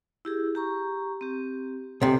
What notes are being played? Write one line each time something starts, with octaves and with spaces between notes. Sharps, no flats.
E4 G4 G#4
G4 A#5 C#6
C4 G4
C#2 C3 A4